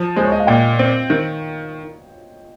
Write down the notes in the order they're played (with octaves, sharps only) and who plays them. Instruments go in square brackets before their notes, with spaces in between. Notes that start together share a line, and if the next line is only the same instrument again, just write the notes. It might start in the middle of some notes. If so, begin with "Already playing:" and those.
Already playing: [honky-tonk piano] F3
[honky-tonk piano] G#3 [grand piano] C5
[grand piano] C#5
D#5
F5
[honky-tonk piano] A#2 [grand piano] G5
[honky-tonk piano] C4
D#3